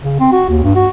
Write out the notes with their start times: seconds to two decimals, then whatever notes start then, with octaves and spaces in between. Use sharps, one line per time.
0.02 C#3
0.20 C4
0.32 F#4
0.49 D#2
0.63 G2
0.75 F#4